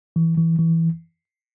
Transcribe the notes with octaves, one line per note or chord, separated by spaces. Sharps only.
E3
E3
E3